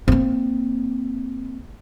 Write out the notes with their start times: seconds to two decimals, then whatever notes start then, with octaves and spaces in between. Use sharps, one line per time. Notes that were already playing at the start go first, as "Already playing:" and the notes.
0.08 A#3 C4